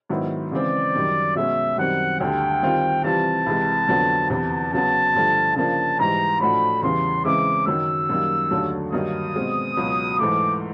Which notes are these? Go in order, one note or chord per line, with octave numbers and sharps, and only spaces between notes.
G#2 D#3 F#3 B3 E4
C#3 E3 G#3 C4 D5
F#2 D#3 G3
B2 G#3 C#4 E5
F#2 D#3 G3 C4 F#5
D2 D3 G3 G5
D#3 G3 C4 F4
C3 E3 G3 C4 F4 A5
C2 C3 E3 G#3
F2 D3 F#3 B3
E2 C3 E3 A5
C#3 F#3 B3 A5
G2 D3 F3 A3
C#3 F3 A#3 D4 A5
G#2 E3 G3 A#5
A2 F3 A3 D4 F#4 B5
E2 C#3 E3 G3 C6
C#3 E3 G#3 C4 E4 D6
F#2 D#3 F#3 E6
F#2 D#3 G3 A#3
D#2 D3 F#3 A3
G2 D#3 F#3 A#3 D#4 D#6
B2 G#3 C4
C#2 B2 F#3
G#2 E3 A3 D6